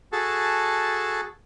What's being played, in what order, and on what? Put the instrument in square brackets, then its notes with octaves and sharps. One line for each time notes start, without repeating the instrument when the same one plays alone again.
[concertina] F#4 G#4 A4 A5